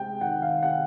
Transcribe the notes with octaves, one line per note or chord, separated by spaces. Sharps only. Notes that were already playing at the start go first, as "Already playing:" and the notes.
Already playing: C3 G#3 G5
D#3 F#5
F5
C3 F#5